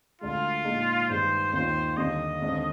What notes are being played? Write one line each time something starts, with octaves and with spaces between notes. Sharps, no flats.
D2 D3 G#3 F4
A#2 G#3 D#4
G2 D#3 G#3 C5
D#2 D#3 A#3 F4 C5
D#2 D3 G3 D#5
D#2 D3 G#3 C4